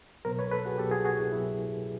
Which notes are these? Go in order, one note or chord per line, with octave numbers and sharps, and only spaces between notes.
C2 B2 F#3 A#4 C5
B4 C#5
A4 B4
F#4 G#4
C2 B2 F#3 G4 A4
F#4 G#4
F#4 G#4
E4
C2 B2 F#3 E4